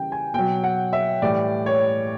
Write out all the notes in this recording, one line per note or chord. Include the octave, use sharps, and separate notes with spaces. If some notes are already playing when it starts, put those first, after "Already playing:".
Already playing: C#3 E3 G3 G5
G#5
B2 F#3 G5
F#5
E5
A2 E3 G3 D5
C#5